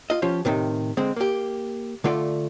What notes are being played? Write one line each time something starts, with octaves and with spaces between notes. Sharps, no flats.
F4 D#5
F3 C#4 F4 G4
A2 C3 D#3
D3 G#3 C4
A#3 G4
D3 A3 F4 D5